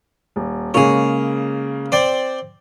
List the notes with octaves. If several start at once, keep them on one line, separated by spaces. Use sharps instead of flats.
D#1
C#3 G#3 A#3 G#4 C#5
C4 D5 G5